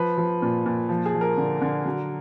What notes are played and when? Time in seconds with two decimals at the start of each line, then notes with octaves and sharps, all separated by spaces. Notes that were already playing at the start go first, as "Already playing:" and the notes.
Already playing: F3 B4
0.18 F3
0.42 A#2
0.66 A#2
0.89 F3
1.06 G#4
1.14 F3
1.21 A#4
1.37 D3
1.61 D3
1.86 F#3